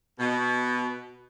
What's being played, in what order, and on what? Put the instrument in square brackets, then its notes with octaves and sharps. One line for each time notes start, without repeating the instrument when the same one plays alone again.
[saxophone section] B2